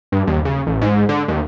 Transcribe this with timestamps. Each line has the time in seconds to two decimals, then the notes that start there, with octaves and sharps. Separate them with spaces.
0.12 G2
0.27 D#2
0.45 C#3
0.67 A1
0.82 G#2
1.09 D3
1.28 D#2